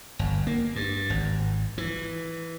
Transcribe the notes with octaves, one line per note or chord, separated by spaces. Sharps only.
G1
A#3
G2
G#1
E3